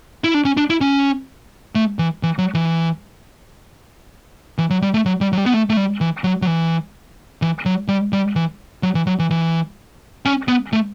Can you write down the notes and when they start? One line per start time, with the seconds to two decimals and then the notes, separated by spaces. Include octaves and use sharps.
0.24 E4
0.34 D4
0.45 C#4
0.57 D4
0.70 E4
0.81 C#4
1.75 A3
1.99 E3
2.23 E3
2.38 F#3
2.54 E3
4.58 E3
4.70 F#3
4.82 G3
4.94 A3
5.06 F#3
5.21 G3
5.32 F#3
5.37 G3
5.46 B3
5.54 A3
5.70 A3
5.77 G3
6.01 E3
6.24 F#3
6.42 F#3
6.47 E3
7.42 E3
7.66 F#3
7.88 G3
8.13 G3
8.36 E3
8.83 F#3
8.95 E3
9.07 F#3
9.19 E3
9.30 E3
10.26 C#4
10.48 B3
10.73 A3